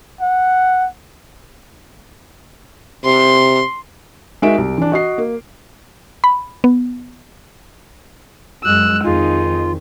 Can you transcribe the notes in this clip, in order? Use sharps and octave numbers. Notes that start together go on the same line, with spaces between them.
F#5
C3 C6
G#3 D#4 F#4 A#4 E5 D7
C2
E3 D4
F#4 D#5 C7
A#3
B5
B3
F#2 G#3 E6 F#6
F2 D#3 D#4 F4 G#4